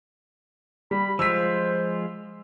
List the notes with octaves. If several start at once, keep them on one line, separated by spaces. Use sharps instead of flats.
G3 B5
F3 G#3 F4 C5 E6 B6